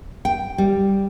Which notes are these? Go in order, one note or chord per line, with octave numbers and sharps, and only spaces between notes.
G5
G3